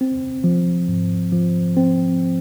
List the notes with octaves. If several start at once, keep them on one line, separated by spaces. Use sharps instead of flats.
C4
F3
G#2
F3
C4